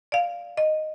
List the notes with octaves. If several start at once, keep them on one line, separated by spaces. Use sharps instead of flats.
D5 F5
D#5